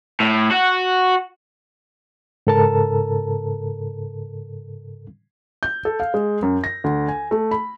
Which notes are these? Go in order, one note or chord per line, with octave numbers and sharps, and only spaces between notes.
A2
F#4
G#2 C#3 A4 A#4 A5 A#5
G6
A4
F5
G#3
F#2
A#6
D2
G#5
A3
B5